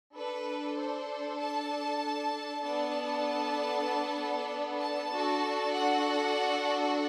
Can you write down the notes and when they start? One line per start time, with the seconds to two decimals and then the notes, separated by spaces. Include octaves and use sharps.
0.16 D4 A4 B4
0.78 C5
1.40 A5
2.63 B3 D4 A4 A5
4.80 A5
5.12 D4 F#4 A4
5.73 F#5